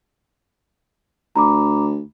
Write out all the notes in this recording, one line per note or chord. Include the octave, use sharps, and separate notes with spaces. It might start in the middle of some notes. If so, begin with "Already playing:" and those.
D2 A#5 B5 D6